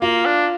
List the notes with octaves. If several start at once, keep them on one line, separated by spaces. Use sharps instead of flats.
A#3 F4
D4